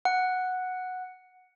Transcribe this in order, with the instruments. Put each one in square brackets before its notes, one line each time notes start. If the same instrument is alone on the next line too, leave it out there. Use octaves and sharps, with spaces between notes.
[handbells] F#5